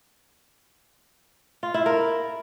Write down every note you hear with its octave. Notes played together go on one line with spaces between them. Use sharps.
F4
E4
A#4